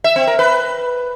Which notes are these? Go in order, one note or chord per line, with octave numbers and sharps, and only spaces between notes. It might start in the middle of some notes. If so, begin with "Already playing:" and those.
E5
C4
A#4
B4